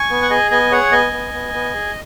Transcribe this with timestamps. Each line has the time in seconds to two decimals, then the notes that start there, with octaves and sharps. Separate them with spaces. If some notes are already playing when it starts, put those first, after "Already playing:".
Already playing: G#5 C#6
0.10 B3
0.22 F#5
0.30 G#4 D#5 G#5
0.51 B3 D#5 G#5
0.71 G#4 C#5 F#5
0.92 B3 D#5 G#5
1.13 B3
1.33 B3
1.54 B3
1.74 G#4